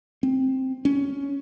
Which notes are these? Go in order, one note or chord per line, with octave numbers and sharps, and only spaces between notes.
C4
C#4